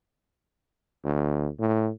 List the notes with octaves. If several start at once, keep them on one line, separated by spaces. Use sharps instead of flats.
D2
A2